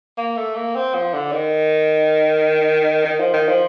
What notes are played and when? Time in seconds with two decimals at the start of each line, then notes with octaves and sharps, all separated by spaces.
0.18 A#3
0.37 A3
0.56 A#3
0.75 C4
0.94 F3
1.14 D3
1.32 D#3
3.05 D#3
3.20 F3
3.34 D#3
3.48 F3